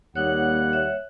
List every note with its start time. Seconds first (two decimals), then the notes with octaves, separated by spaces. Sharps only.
0.15 D#2 G3 A#3 D#4 C#5 F#5 F#6
0.73 C#5 E5